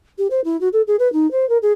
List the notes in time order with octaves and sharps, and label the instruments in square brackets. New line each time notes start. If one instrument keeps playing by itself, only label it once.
[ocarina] G4
C5
E4
F#4
A4
G#4
B4
D#4
C5
A#4
G#4